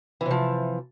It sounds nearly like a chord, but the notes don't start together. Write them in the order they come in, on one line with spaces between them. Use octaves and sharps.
E3 C3 F3